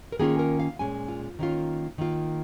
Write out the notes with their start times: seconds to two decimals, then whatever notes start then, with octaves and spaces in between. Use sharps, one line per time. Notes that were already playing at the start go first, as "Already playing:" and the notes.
0.12 A#4
0.19 D#3 A#3 C#4 F4 G#4
0.39 A#4
0.60 F5
0.79 A#2 G#3 C#4 G#5
1.08 F4
1.39 D#3 A#3 C#4 F4
1.98 D#3 A#3 F4